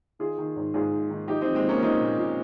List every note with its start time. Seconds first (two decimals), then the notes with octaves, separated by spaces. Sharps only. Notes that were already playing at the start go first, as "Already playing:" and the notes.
0.19 D#3 F4 G#4
0.38 D#3
0.56 G#2
0.74 G#2 F4 G#4
0.92 D#3
1.10 D#3
1.28 F3 D#4 G4
1.41 C4 D#4
1.47 F3
1.55 G#3 C4
1.64 F3 A#3 C#4
1.82 F3 C4 D#4
2.01 A#2
2.18 A#2